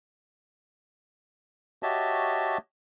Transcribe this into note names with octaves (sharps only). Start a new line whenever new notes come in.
F#4 G4 C#5 D#5 E5 A5